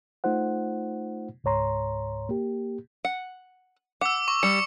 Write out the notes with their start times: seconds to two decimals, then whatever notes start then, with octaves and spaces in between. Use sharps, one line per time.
0.24 A3 D#4 F4 C5 F#5
1.44 C#2 G#2 C#5 A#5 C6
2.29 A#3 G4
3.05 F#5
4.01 F#5 D6 E6
4.28 C#6
4.43 G3 C#7